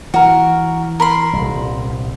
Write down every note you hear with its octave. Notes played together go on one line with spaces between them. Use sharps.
E3 F#4 A#4
A#4 B5 C6
D#1 C2